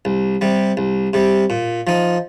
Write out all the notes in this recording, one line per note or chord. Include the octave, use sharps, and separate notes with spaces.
C2
C3 G3
C2
C3 G3
A#2
F3 D#4